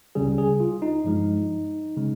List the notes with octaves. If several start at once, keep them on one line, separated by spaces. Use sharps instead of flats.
C#2 C#3 G3 G#4
G#4
F4
D#4
G2 F3 G#3
C#3 G#3